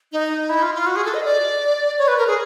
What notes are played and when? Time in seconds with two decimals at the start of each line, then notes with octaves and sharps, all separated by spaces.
0.12 D#4
0.49 E4
0.62 F4
0.75 F4
0.87 F#4
0.96 G#4
1.05 A4
1.14 D#5
1.24 D5
1.98 C#5
2.08 B4
2.18 A#4
2.27 G#4